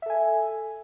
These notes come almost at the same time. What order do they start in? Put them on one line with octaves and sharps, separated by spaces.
E5 A4 G#5